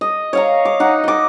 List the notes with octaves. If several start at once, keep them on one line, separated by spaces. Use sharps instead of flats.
D#5
C#5 F5 A#5
D6
D#4 F#5
D#5 D6